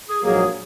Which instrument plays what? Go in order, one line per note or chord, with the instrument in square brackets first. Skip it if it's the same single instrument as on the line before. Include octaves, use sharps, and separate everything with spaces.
[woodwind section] G#4
[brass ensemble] A#1 G#2 F#3 A#3 [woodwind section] G#4